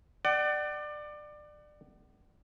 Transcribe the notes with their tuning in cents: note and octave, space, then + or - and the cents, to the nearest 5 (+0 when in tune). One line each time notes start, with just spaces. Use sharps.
D5 +25 F#5 +40